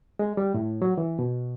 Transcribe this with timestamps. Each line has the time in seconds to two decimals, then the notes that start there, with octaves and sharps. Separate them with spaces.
0.19 G#3
0.37 G3
0.54 A2
0.82 F#3
0.98 E3
1.19 B2